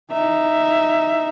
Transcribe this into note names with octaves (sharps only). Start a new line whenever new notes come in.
D#4 E5